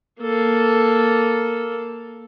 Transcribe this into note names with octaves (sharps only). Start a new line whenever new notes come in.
A#3 A4